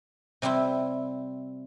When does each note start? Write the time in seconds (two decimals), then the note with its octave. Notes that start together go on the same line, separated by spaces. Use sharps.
0.42 C3 G3 C4 E4